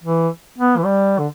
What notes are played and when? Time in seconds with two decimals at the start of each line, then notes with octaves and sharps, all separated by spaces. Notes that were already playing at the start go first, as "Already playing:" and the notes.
0.03 E3
0.58 B3
0.77 E3
0.85 G3
1.19 D3